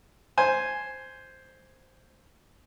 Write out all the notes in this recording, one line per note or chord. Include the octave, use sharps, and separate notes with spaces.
C5 G#5